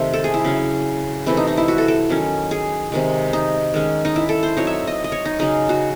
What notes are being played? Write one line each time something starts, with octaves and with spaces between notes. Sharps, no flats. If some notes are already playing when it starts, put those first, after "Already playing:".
Already playing: C3 D#3 A3 C5 E5
A4
G#4
E4
C#3 F#3 C#4
C3 E3 A3 C4 E4
D#4
D#4
E4
F#4
A4
A4
D#3 F#3 C#4
G#4
C3 D#3 G#3
D#4
D#3 G#3 C#4
D#4
E4
A4
C5
F#3 C4 D#4 C#5
E5
D#5
D#5
C#5
D#4
C#3 F#3 C#4 D#4
F#4